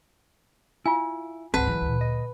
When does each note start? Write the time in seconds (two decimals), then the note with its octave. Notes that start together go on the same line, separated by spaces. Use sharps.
0.86 E4 F4 F5 G#5
1.54 G#1 C#2 C4 B4 F#5 A5
1.67 D2 E3 F#3
1.81 D2 A#2
2.01 D#5